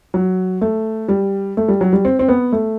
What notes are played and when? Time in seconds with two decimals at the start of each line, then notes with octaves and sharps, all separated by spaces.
0.14 F#3
0.61 A3
1.08 G3
1.57 A3
1.68 G3
1.81 F#3
1.93 G3
2.05 C4
2.19 C4
2.29 B3
2.52 A3